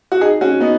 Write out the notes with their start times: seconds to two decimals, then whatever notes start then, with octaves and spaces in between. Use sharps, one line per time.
0.12 F#4
0.21 D#4 G#4
0.41 C#4 F#4
0.60 B3 D#4